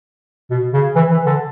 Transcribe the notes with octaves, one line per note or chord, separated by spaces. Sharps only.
B2
C#3
E3
E3
D3